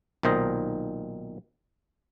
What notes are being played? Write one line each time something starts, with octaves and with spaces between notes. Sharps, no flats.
B1 A#2 D#3 C5 D#5